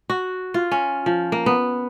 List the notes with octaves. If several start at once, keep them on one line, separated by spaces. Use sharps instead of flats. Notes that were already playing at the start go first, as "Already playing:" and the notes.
F#4
F4
C#4
F3
A#3
B3